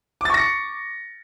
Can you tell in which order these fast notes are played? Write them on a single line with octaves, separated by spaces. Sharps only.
D6 A6 C#6 A#6 C#7